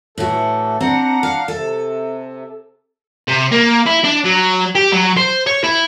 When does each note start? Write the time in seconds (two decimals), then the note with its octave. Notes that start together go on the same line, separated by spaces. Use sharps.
0.18 A2 E3 F#4 A4
0.81 C4 D4 F#5 A#5
1.23 F5
1.48 C3 A4
3.28 C3
3.51 A#3
3.86 E4
4.04 D4
4.24 F#3
4.75 G4
4.92 F#3
5.17 C5
5.47 C#5
5.64 E4